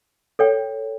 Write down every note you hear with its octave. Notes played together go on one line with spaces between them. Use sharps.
A4 C#5 G5